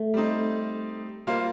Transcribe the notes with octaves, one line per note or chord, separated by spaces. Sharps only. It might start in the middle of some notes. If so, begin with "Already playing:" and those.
Already playing: A3
G3 C4 D#4
G3 A#3 F4 C5 F5